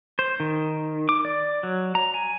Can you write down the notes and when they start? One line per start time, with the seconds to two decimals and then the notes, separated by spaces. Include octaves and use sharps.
0.19 C5
0.40 D#3
1.09 D6
1.25 D5
1.63 F#3
1.95 A#5
2.14 G#5